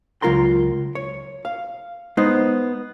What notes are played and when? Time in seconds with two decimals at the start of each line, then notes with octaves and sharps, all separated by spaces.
0.22 C#2 F#3 F4 A#4 A#5 C6
0.95 C#5
1.45 F5
2.17 G#3 B3 D#4 C5